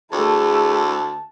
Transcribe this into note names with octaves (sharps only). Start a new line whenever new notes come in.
D2 A3 E4 G#4 A5